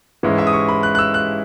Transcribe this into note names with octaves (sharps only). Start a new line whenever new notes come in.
G#2 E3 G#3 C#4 E4
E5
D#6
C#6
B5
F#6
F#6
E6
F#6